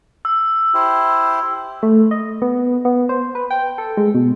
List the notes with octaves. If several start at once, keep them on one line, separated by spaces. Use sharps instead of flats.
E6
E4 G4 C5
A3
D#5
B3
B3
C5
B4
G5
A4
G#3
B2